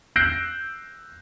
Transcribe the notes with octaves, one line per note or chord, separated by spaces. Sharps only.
E6 F#6 G6 A#6 C7 D7